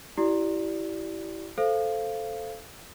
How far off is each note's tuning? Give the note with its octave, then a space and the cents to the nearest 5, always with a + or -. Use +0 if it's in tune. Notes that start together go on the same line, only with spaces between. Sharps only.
E4 +0 G4 -35 D5 +0
A4 +0 C5 +0 F5 -20